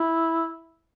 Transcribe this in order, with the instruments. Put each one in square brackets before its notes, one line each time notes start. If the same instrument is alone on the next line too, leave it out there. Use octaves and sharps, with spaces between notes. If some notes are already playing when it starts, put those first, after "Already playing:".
Already playing: [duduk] E4